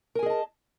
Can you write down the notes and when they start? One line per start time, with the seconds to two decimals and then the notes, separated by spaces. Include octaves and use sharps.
0.15 A#4
0.19 G#5
0.23 G#4
0.26 D#5
0.30 A5